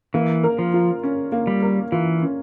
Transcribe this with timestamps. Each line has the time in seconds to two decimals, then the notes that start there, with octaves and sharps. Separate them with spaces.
0.14 E3 A#3
0.43 A#4
0.58 F3
0.74 F4
1.03 C#4
1.32 A#3
1.47 G3
1.62 A#4
1.92 E3 F4
2.22 C#4